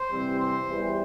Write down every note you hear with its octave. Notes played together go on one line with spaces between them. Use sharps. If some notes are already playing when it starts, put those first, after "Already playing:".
Already playing: C5
C3 E3 G3 C4
C5
E2 E3 G3